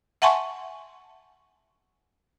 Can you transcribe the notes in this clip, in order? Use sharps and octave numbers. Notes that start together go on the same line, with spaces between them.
E5 F#5 G#5 A5 C6 C#6